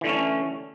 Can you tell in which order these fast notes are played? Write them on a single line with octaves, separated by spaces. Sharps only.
E3 D3 A3 C#4